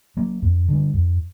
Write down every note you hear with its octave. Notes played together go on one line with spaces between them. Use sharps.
F#3 A#3
F2
D3 G3
F2